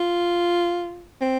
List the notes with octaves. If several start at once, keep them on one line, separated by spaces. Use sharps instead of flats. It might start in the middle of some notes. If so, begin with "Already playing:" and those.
Already playing: F4
C4